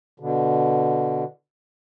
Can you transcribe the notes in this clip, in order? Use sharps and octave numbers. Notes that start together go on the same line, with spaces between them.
B2 D3